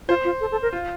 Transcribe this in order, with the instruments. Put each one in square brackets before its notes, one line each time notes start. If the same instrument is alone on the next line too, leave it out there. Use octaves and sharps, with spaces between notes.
[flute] F4 [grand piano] C5
[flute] F4
A4
A4
A#4
[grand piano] F4